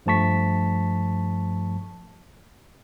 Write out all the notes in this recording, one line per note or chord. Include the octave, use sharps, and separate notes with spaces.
G2 F3 A3 A5 C#6 B6